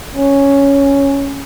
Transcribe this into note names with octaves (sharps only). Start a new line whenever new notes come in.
C#4